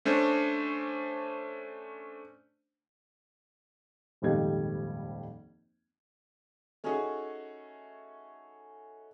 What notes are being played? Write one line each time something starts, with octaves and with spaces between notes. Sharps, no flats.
A3 C#4 D4 C5
D#1 G#1 F2 G3 D#5 G#6
A3 C#4 D#4 F#4 G#4